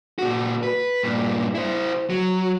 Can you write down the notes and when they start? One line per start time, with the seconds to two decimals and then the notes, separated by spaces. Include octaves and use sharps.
0.19 A#2 F#4
0.63 B4
1.03 G2 A#2
1.55 E4 C5
2.10 F#3